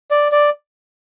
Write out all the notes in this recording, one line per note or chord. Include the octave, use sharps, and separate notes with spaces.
D5
D5